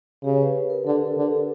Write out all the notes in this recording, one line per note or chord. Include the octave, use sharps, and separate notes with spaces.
C#3 G4
B4
A#4
D3 A4
D3